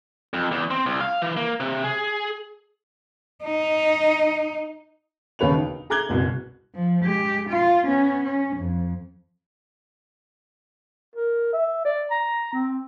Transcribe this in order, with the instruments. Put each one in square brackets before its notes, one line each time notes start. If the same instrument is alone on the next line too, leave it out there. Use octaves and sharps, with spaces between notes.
[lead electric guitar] F2
E2
C4
C2
F5
E3
A#3
C3
G#4
[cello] D#4
[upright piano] E1 D#2 C#3 B4 C#5 F7
D#4
G#4 A#5 D6 F#6 G#6 G7
F#1 C2 B2
[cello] F3
G#3 G4
F4
B3 C#4
C#4
F2
[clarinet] A#4
E5
D5
A#5
C4